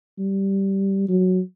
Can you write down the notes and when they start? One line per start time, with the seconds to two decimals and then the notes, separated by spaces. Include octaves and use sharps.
0.18 G3
1.09 F#3